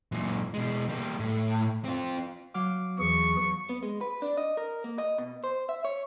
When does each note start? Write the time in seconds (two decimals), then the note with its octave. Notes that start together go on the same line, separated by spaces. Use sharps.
0.12 F#2 A#2
0.54 B2 G#3
0.89 G3 A#3
1.20 A2
1.85 C4 F4
2.54 F#3 F5 D6
2.99 E2 E3 G#4 C#6
3.69 B3
3.83 G#3
4.01 B4
4.22 D4
4.37 D#5
4.57 A#4
4.84 A#3
4.98 D#5
5.18 B2
5.44 C5
5.69 E5
5.85 C#5